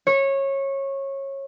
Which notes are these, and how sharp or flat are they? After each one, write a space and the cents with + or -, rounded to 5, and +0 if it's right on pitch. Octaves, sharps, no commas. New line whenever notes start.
C#5 -20